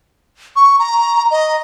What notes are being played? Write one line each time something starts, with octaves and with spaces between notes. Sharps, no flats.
C#6
A#5
D#5